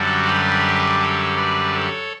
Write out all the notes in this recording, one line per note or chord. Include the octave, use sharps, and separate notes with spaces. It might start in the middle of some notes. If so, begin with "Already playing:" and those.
Already playing: F#2 D3 G3 D4 F#4 A4
G4 B4
A4 C#5
B4 D5
A4 C#5